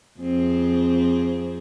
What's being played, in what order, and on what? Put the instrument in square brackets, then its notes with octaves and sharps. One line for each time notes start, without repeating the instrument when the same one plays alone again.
[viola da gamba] F2 C4 G#4